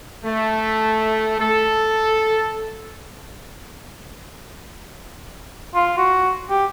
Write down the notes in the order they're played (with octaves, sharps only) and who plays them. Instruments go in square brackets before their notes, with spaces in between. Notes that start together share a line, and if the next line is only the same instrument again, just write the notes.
[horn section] A3
A4
[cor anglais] F4
F#4
G4